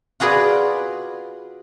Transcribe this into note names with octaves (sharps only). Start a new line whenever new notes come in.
F4 F#4 G#4 B4 D5